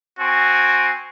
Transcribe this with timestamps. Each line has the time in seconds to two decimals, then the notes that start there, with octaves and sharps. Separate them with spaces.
0.20 C4 F#4 G#5